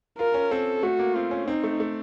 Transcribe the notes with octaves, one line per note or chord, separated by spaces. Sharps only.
F4 A#4
C#4
C4 A4
A3 F#4
A#3
C4 F4
C#4
C4 D#4
A3
A3